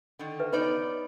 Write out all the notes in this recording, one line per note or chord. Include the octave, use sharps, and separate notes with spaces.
D3 D#3
B4 E5
B3 D#4 B4 C#5 D5